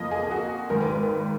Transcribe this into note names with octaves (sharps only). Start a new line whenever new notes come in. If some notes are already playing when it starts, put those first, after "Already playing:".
Already playing: F2 F3 A#3 D#5
G#4
G#4
F#4
G#1 G#2 D#3 A#4
B4